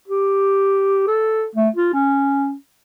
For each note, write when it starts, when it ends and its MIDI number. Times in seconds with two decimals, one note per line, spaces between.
0.08 1.07 67
1.08 1.45 69
1.56 1.69 57
1.76 1.93 65
1.94 2.53 61